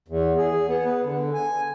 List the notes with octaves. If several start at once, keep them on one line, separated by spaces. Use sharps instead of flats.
E2
G#4
B3
B4
D3
G#5